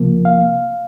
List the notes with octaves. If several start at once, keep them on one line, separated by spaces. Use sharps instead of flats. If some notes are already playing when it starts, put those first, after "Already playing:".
Already playing: C#2 C3 F3 A#3
F5